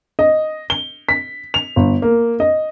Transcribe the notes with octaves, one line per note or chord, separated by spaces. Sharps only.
D#5
G7
B6
F7
G1
A#3
D#5